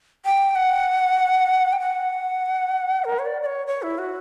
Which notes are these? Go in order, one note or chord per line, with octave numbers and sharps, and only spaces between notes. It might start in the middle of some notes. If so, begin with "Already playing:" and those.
G5
F#5
G5
F#5
A#4
C#5
D5
D5
C#5
C#5
E4
F#4